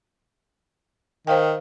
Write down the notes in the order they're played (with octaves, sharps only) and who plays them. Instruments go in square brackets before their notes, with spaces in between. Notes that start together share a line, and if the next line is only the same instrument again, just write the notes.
[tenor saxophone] D#3 [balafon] C5 F5 G5